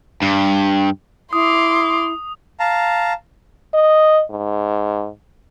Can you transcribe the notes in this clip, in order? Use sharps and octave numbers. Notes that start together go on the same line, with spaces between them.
G2
E4 C6 D6 D#6
F5 A5 A#5
D#5
G#2